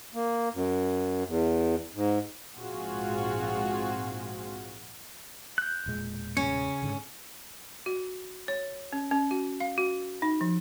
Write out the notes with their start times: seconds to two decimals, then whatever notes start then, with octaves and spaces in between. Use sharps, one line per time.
0.14 A#3
0.54 F#2
1.27 E2
1.94 G#2
2.58 A#1 G#2 C4 F4 F#4 G#4
5.58 F#6 G6
5.86 E1 A#2 G#3
6.37 C#3 C#4 C#5
6.82 G#2 D3
7.86 F#4
8.48 C#5
8.93 C#4
9.11 C#4
9.31 F#4
9.60 F5
9.78 F#4
10.22 D#4
10.41 F3